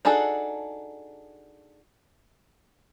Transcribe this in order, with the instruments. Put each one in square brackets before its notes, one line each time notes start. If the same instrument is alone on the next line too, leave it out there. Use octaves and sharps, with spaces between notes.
[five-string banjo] D4 D#4 F#4 G#4 A4